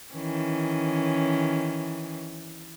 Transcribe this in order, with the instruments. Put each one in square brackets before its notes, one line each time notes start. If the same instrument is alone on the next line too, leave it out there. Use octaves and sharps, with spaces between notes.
[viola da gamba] D#3 E3 C#4